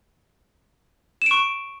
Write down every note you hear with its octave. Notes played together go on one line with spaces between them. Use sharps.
C#6 D7 E7